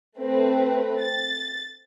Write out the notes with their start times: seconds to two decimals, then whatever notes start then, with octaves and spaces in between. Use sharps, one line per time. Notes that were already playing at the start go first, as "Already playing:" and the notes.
0.18 A3 C4 B4
1.00 A6